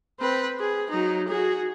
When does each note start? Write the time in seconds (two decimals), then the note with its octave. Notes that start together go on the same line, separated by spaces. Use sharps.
0.20 C4 B4
0.59 G#4
0.89 F#3 D#4
1.28 F#4 G#4